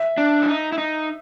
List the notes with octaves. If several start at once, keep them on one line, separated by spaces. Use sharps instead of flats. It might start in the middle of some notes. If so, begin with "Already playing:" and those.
Already playing: E5
D4
E4
D#4
E4
D#4